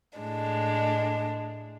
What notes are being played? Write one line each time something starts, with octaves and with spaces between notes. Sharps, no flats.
A2 G#3 D4